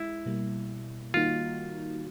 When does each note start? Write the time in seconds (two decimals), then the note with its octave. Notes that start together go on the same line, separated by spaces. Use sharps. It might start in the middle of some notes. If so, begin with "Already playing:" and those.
Already playing: G#3 E4
0.26 B2 G3 A#3
1.14 D#3 G3 A#3 D#4 F4 F#4